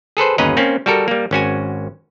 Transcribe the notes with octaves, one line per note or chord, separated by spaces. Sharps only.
G#4 A4 B4 C5
G1 D#2 C#4 B4 D#5 A#5
A#3 C4 C#4
G3 F#4 A4 A#4
G3 A#3
G#1 C#4 F#4 G#5